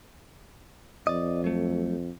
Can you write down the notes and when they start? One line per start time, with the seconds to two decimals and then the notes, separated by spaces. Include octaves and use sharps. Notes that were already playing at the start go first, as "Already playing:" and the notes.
1.07 F2 D5 D#5
1.44 F#3 A3